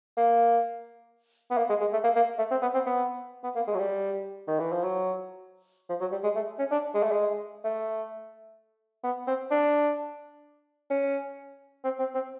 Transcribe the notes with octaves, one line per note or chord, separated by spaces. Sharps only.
A#3
B3
A#3
G#3
G#3
A3
A#3
A#3
A3
C4
B3
C4
B3
B3
A#3
G#3
F#3
G3
D#3
E3
F3
F#3
F3
F#3
G3
G#3
A3
C#4
D4
G#3
A3
G#3
A3
B3
C4
D4
C#4
C4
C4
C4